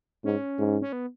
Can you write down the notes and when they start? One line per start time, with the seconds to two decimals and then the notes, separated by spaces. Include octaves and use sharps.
0.25 G#2 C#4
0.58 G#2
0.82 C#4
0.93 B3